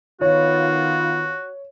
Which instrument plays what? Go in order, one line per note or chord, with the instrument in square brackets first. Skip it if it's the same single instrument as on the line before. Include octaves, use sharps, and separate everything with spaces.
[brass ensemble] D#3 B3 F4 [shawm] F#4 [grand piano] C#5